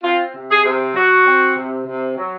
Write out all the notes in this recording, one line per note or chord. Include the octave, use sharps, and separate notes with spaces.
C4 F4
C3
G#4
C3
F#3 F#4
C4
C3
C3
F#3